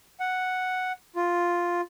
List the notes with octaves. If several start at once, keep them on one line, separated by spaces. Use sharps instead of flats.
F#5
F4